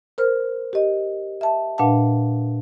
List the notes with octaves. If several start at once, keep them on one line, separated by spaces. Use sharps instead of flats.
A#4 C5 F6
G4 D#5
E5 A5
A#2 D4 B4 F5 F#5 A5